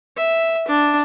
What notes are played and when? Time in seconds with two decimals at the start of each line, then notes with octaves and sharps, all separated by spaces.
0.16 E5
0.68 D4